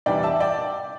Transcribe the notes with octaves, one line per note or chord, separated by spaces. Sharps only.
E2 C3 E3 G3 D5 G5
E5 A5
D5 G5